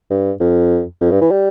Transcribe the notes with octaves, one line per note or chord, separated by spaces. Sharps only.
G2
F2
F2
G2
E3
G3